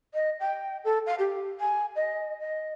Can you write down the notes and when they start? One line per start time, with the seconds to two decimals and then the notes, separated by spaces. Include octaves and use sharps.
0.14 D#5
0.40 G5
0.85 A4
1.06 F5
1.19 G4
1.60 G#5
1.96 D#5
2.40 D#5